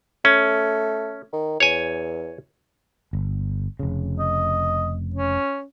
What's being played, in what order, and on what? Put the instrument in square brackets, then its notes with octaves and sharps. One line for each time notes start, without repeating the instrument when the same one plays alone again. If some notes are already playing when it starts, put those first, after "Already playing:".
[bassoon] A3 [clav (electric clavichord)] C#4
[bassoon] D#3
[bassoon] E2 [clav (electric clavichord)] C#5 G#5
[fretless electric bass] G1
F1 C#3
[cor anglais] D#5
C#4